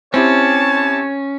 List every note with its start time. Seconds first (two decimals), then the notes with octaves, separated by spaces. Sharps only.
0.14 C4 C#4 E4 G4 C#5 A5